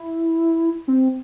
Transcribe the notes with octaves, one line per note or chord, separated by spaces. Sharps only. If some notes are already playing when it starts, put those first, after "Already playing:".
Already playing: E4
C4